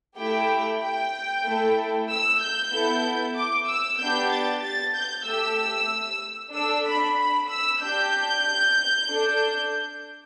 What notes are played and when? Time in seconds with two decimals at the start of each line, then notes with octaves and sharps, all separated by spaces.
0.18 A3 E4 G4 G5
0.81 G5
1.44 A3 E4 A4
2.08 E6
2.40 G6
2.72 B3 E4 A4
3.35 D6
3.67 E6
3.99 B3 D4 G4 G6
4.31 A6
4.63 A6
4.95 G6
5.26 A3 G4 E6
6.53 D4 A4 E6
6.85 B5
7.18 B5
7.49 E6
7.81 D4 G4 G6
9.08 D4 A4